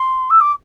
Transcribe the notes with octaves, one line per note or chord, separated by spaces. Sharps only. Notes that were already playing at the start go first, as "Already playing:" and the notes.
Already playing: C6
E6
D6